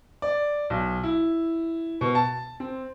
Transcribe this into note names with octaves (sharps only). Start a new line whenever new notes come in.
D5
B1
E4
B2
A5
C4